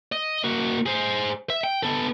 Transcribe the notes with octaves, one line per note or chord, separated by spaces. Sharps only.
D#5
A#3 F#4
G#4 C5
E5
G5
B3 A4